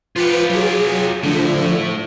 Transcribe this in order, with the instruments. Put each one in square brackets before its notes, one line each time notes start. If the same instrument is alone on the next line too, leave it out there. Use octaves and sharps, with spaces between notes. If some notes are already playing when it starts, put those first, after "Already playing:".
[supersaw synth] F3 B4 C#7 [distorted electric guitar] F4 G4
[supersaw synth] F#3 G#4
[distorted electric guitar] A2 A3 [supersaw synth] D3 F3